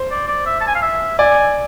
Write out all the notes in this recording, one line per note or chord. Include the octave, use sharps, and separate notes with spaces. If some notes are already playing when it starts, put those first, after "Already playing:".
Already playing: C5
D5
D5
E5
A5
G#5
F5
E5
D5 G#5